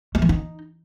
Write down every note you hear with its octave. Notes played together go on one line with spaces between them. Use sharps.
A3
E3
D#4